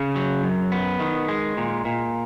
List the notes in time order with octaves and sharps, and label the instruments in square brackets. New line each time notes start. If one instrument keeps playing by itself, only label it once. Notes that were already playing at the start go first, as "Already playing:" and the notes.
Already playing: [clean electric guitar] C#3
F#3
F#2
B3
D#3
G#3
A#2
A#2